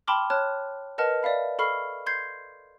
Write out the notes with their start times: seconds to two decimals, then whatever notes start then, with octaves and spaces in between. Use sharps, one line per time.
0.07 G5 A5 B5 C6 D6 F6
0.30 C#5 A5 F6 F#6
0.98 A#4 B4 D#5 F#5 A5 F6
1.23 D5 E5 F5 B5
1.59 A4 B5 C#6 F6 C7
2.06 C6 G6 G#6 C7